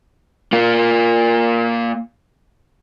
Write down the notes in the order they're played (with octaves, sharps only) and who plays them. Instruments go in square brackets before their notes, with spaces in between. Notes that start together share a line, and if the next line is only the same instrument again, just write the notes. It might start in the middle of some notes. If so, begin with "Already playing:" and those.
[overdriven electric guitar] A#3 F4